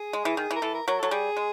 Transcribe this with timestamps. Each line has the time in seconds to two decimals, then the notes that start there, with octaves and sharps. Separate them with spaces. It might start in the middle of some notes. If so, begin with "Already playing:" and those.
Already playing: G#4
0.13 G#3
0.25 E3
0.37 D#3
0.51 E3
0.56 A#4
0.62 E3 A4
0.74 A#4
0.87 F#3 A#4
0.99 F#3 A4
1.11 G3 G#4
1.37 G#3